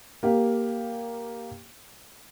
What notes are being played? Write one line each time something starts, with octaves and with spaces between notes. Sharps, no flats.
A#3 G4 F5